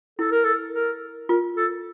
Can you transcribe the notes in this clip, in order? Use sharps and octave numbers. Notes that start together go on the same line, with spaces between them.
E4 A4
A#4
A4
A#4
F4 A#4
A4